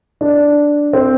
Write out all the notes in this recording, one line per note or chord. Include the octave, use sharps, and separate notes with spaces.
D4
C4